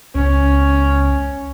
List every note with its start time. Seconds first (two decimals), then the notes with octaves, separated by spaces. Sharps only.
0.15 C#2 C#4